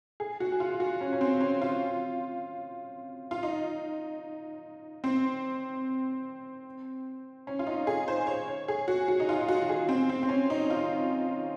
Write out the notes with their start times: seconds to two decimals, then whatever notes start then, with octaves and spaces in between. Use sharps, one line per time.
0.20 G#4
0.40 F#4
0.52 F#4
0.60 F4
0.80 F#4
1.01 C#4
1.13 C#4
1.21 C4
1.41 C#4
1.62 F4
3.31 F4
3.43 D#4
5.04 C4
7.47 C#4
7.59 F4
7.67 D#4
7.87 G#4
8.08 C5
8.27 C#5
8.48 C#5
8.68 G#4
8.88 F#4
9.08 F#4
9.20 D#4
9.29 F4
9.48 F#4
9.63 F#4
9.69 G#4
9.89 C4
10.09 C4
10.23 C4
10.29 C#4
10.50 D#4
10.70 F4